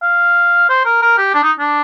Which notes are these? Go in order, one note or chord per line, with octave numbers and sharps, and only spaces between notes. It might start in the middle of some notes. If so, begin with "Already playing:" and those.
F5
C5
A#4
A#4
G4
D4
D#4
D4